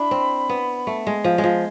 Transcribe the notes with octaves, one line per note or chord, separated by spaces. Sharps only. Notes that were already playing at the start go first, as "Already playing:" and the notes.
Already playing: D4 E4 B5
C4
B3
A3
G#3
F3
G#3
F3